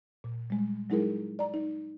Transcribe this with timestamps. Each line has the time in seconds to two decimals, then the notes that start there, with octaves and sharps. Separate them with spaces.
0.24 A#2
0.50 G3 G#3
0.90 F#3 G#3 D#4 E4 G#4 A#4
1.39 D5 A#5
1.54 D#4